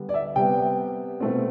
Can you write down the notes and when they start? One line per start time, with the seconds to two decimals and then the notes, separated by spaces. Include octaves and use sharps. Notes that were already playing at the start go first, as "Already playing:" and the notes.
Already playing: D3 G3 B3
0.09 D5
0.14 E5
0.36 C3 G3 B3 G5
1.20 B2 A3 C4